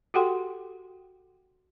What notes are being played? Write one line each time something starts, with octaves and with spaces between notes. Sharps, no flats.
F#4 G4 A4 F#5 G5 C6